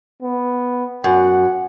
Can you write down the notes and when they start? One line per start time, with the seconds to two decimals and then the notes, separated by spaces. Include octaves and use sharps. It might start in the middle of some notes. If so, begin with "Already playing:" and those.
0.22 B3
1.04 F#2 F#5